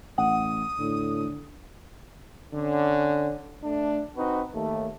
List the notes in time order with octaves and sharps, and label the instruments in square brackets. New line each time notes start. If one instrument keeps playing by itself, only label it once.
[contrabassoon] A1 [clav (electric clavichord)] F#5 [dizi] D#6
[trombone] A2 [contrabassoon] D3
[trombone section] D3 C#4
A3 D4
C4 D#4 F#4 B4
D#2 A3